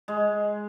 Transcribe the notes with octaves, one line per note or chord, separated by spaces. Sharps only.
G#3